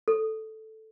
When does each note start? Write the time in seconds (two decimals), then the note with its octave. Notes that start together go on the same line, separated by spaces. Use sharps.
0.08 A4